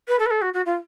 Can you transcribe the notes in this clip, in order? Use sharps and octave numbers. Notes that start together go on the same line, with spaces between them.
B4
A4
B4
A4
F#4
F#4
F4